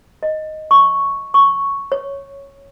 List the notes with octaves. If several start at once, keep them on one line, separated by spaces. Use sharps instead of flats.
D#5
C#6
C#6
C#5